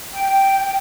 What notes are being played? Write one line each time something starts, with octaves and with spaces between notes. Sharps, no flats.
G5